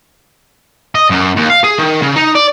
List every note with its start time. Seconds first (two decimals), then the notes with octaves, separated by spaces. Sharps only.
0.95 D#5
1.10 F#2
1.36 D#2
1.50 F5
1.64 G#4
1.79 D#3
2.03 C#3
2.16 D#4
2.35 D5